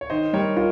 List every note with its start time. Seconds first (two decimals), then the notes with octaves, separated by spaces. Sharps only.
0.01 C#5
0.10 D#3 C5 D#5
0.33 G3 A#4 C#5
0.57 F4 A#4